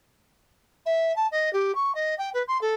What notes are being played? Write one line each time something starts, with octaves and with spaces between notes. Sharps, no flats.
E5
A5
D#5
G4
C#6
D#5
G5
B4
C6
A4